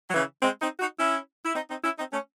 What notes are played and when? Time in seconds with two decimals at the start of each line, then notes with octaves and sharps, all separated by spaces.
0.09 F#3
0.14 C#3 E3
0.42 G#3 C4
0.61 C4 D#4
0.80 D#4 F#4
0.99 C#4 E4
1.45 E4
1.55 C4 D#4
1.70 C4 D#4
1.84 C#4 E4
1.98 C4 D#4
2.12 A3 C#4